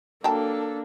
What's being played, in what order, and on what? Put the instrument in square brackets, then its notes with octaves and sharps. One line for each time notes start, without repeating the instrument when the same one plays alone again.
[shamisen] F#3 G5 A5 [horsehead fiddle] A#3 D4 [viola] A4